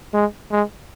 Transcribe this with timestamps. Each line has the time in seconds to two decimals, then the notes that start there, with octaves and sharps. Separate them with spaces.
0.13 G#3
0.51 G#3